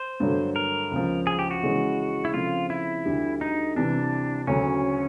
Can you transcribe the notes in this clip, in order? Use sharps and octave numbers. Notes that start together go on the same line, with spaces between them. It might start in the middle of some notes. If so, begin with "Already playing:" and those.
Already playing: C5
G2 D3 F#3 A3
A#4
C#2 C#3 F3
G#4
G4
F#4
C#3 E3 G#3 C#4 E4
E4
C#3 F3 A3 C4 F4
E4
D2 D3 G3
D#4
C3 E3 G3 D4
D2 C#3 F#3 C#4